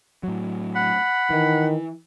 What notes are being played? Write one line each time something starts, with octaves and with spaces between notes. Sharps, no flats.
A2 F#3
F#5 B5
D#3 E3